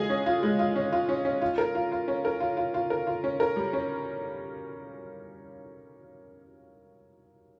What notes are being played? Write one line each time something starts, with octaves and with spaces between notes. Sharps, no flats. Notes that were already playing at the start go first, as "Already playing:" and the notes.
Already playing: G#3 F4 G#4
C#4
F4
G#3
F4
C#4
F4
C#4
C#4
F4
A#4
F4
F4
C#4
A#4
F4
F4
F4
A#4
F4
C#4
A#4
G3
C#4